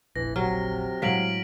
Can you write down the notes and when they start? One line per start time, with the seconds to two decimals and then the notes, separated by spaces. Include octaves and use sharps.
0.16 F1 A#1 E3 A#6
0.36 C3 F#3 F6
1.02 A2 F#3 G#3 F5 B6 D7 F#7